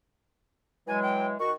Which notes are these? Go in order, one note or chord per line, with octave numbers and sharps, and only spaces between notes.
E3 F#3 G#3 G#5
G5
D#3 F#4 C#6